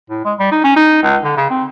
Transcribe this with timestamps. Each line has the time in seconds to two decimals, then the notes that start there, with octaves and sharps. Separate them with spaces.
0.10 A2
0.25 G#3
0.39 G3
0.51 D#4
0.64 C#4
0.76 D#4
1.02 C#2
1.24 D3
1.37 C#3
1.50 C4